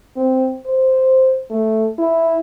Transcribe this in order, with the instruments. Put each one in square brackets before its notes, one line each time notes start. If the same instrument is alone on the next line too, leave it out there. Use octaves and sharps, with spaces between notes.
[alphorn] C4
C5
A3
E4